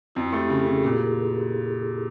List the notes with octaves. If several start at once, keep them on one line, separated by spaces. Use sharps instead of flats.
F2 E4 F#4
A3 F4 G4
C#3 G4 A4
G4
C#3 F#4 G#4
A#2 G#4 A#4